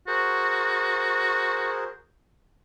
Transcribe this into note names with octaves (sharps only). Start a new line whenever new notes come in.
F#4 G#4 A#4 C5